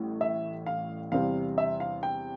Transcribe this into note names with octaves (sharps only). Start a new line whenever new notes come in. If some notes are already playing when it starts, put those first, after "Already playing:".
Already playing: A1 A2 G3
E5
F5
E2 C3 G3 C4 F5
E5
F5
G5